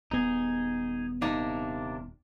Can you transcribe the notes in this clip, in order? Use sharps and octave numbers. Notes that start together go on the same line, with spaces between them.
D#1 B3 D#4 G#4
C3 A#3 D4 D#4